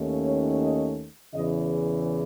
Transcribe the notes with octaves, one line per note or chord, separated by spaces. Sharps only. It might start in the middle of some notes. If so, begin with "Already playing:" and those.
Already playing: D#2 D#3 A3 C#4
C#5
D#5
E2 C#3 E3 D#5